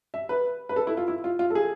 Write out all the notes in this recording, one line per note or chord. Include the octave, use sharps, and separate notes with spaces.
E5
B4
B4
A4
E4
F4
E4
F4
F4
A4
G#4